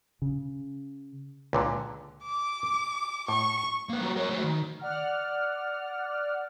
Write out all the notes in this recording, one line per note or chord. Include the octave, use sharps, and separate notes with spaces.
C#3
C#2 A#2 D3
D6
A2 C#6
A#3 B4
G3 F#4
A#4 C#5
A3 F#4
D#3
D5 F#5 F6